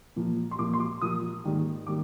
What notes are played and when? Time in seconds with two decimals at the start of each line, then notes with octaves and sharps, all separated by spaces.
0.16 A#2 F3 A#3
0.51 C6
0.59 A#2 F3 A#3 D6
0.73 C6
0.80 D6
1.01 A#2 F3 A#3 D#6
1.44 G#2 D#3 G3 A#3
1.87 D#3 G3 A#3 D6